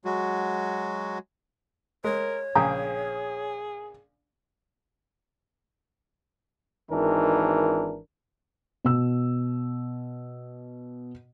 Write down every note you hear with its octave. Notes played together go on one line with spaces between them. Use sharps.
F#3 G#3 F#4
G#3 A#4 C#5
A#1 C#3 G#4 G5 A#5
G#1 D#3 E3 D4 A#4
B2 E6